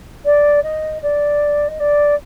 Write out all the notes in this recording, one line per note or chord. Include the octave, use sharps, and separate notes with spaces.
D5
D#5
D5
D#5
D5